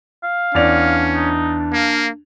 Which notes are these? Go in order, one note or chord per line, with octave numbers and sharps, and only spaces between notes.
F5
E2 C#4 D4 D5 F7
D#4
A#3 F5